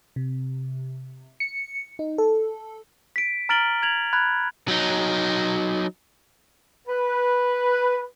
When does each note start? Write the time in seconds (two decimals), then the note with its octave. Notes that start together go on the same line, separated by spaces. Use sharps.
0.16 C3
1.40 C#7
1.99 D#4
2.18 A4
3.16 B6 D7
3.49 A#5 F6 A6 D7 F#7 G7
3.83 G#6 F7 F#7
4.13 B5 F#6 G#6
4.68 F#3 D#4
6.88 B4